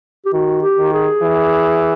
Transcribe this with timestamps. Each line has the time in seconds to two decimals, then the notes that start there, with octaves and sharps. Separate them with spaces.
0.25 G4
0.33 D#3 F#4
0.62 G4
0.77 D#3
0.93 G#4
1.22 E3